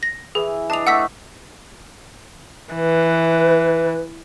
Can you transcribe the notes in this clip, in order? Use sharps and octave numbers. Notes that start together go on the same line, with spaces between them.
A#6
E3 G#4
D4 D#5 A5 F7
A3 F#5 C#6 E6 B6
E3 B4